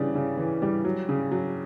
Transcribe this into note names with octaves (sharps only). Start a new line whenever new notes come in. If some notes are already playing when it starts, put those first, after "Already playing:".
Already playing: C#3 E3 G3 D4
C#3
E3
G3
F#3
C#3
F#3